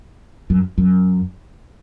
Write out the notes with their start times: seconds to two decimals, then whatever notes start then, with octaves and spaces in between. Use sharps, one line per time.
0.50 F#2
0.78 F#2